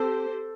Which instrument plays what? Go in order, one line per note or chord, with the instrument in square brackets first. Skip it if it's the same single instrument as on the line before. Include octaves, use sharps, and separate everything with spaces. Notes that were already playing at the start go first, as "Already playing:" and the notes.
Already playing: [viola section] C4 G4 C5 [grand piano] A4